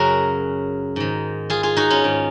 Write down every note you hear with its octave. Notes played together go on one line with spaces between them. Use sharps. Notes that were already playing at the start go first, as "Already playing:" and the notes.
Already playing: F#2 C#3 F#4 A#4
G#2 D#3
F4 G#4
F4 G#4
D#4 F#4
C#4 F4
G#2 D#3